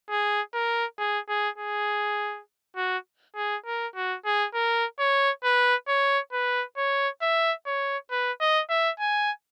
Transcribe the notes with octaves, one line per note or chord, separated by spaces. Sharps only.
G#4
A#4
G#4
G#4
G#4
F#4
G#4
A#4
F#4
G#4
A#4
C#5
B4
C#5
B4
C#5
E5
C#5
B4
D#5
E5
G#5